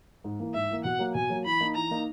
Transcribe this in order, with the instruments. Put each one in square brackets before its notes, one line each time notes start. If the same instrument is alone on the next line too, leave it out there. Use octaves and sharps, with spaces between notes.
[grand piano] G#2
E3 A#3
[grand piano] G#2 [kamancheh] E5
[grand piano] E3 A#3
[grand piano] B2 [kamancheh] F#5
[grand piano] F#3 A#3
[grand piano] B2 [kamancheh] G#5
[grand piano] F#3 A#3
[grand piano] E3 [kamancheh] B5
[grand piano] A#3 D#4
[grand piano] E3 [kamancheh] A#5
[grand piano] A#3 D#4